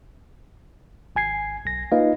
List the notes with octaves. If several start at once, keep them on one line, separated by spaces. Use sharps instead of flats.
G#1 G#5 G#6 C7
B1 A#6
A#3 D#4 F4 B4 D#5 F5